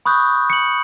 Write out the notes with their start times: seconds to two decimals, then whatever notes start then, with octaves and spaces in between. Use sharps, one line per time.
0.05 B5 C#6 D#6 F#6 G6
0.50 C#7 F#7